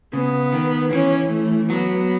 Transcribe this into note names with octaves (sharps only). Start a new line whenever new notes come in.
C#3 B3
D#3
E3 C#4
A3
F#3 B3